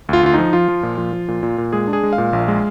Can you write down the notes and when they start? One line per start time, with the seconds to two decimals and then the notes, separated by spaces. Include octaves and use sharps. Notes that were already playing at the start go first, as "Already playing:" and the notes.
0.09 D2 F4
0.23 D2 F4
0.34 F3 D#4
0.53 F3 F4
0.68 F3
0.83 A#2
0.98 F3
1.13 F3
1.28 A#2
1.43 A#2
1.58 A#2
1.73 G#3 G#4
1.88 D4
1.93 G#4
2.03 G#3
2.13 F5
2.18 A#2
2.33 A#1
2.48 G#3